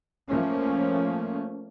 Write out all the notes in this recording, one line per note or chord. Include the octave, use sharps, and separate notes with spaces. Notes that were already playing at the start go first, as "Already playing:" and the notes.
F3 A3 A#3 C#4